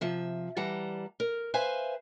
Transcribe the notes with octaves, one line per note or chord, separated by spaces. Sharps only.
C3 F3 E5
E3 G3 F#5 A5 A#5
A#4
B4 C5 E5 F5 G#5